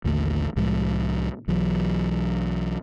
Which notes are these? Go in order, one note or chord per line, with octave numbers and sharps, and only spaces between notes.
A1 D#2 D3 A3
C2 A2 F3 G#3
B1 E3 F#3